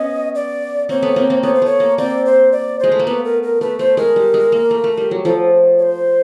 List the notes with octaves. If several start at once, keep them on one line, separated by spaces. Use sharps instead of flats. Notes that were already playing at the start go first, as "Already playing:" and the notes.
Already playing: B3 C#4 D#5
D5
A#3 C4 C#5
A3 B3
A#3 C4
A#3 C4
A3 B3 C#5
C5
A3 C#5
A#3
A#3 C4 D5
C5
D5
G#3 C5
A3
A#3
A3 B3 B4
A#4
A#4
A3 B4
A3 C5
G#3 A#4
G3
G#3
A#3
A3
A3
G3
F#3
F3 A4
C#5
C5